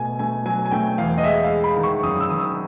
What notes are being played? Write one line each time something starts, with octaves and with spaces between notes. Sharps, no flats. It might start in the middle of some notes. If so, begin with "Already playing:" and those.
Already playing: B2 A3 G#5
A3 G#5
F#3 G#5
G#5
A3 G5
E2 F5
D#5
G#3 E5
F5
G#3
B5
D#3
C#6
F#2 D#6
E6
D#3 D#6